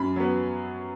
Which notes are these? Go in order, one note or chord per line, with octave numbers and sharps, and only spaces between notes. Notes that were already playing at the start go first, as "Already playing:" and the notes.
Already playing: F#2 B5
F#3 B3